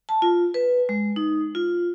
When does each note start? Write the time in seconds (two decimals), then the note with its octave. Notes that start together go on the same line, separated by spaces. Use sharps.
0.09 A5
0.22 F4
0.54 B4
0.89 G#3
1.16 D#4
1.55 F4